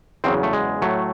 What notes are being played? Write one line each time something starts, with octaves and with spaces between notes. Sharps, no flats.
E2 C#3 F#3 C4
A3
G#3
A2 F#3 A3